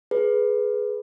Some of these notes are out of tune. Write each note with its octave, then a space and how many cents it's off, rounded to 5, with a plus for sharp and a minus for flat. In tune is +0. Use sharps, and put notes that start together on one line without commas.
G#4 +15 B4 +0